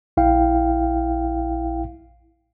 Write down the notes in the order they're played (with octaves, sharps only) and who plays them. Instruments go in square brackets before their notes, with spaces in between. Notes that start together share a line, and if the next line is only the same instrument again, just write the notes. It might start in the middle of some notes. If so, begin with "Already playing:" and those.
[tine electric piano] A#1 E4 F5 G5